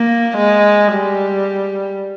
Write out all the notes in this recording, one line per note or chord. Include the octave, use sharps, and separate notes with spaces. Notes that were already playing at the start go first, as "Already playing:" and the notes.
Already playing: A#3
G#3
G3